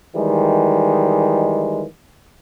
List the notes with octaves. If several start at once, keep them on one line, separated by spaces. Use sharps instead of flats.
D#3 E3 G3 G#3